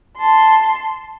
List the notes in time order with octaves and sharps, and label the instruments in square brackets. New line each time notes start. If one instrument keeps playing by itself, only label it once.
[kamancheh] A5 C6